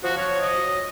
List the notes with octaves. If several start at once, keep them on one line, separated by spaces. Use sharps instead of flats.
F3 F#4
C#5
D#5
F#3